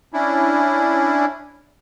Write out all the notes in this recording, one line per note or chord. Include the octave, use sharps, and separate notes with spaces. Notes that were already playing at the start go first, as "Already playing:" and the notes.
C#4 D4 E4